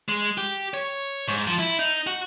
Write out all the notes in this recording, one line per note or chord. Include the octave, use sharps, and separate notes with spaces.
G#3
G4
C#5
G#2
F3
E4
D#4
F#4